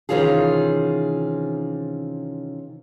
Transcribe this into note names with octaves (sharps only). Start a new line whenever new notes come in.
C3 D#3 E3 C#4 F4 G#4